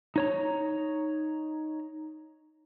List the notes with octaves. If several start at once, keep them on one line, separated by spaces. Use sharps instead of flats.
D#4 C#5 A#5